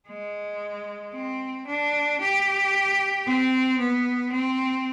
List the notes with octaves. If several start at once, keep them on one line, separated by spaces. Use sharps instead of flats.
G#3
C4
D4
G4
C4
B3
C4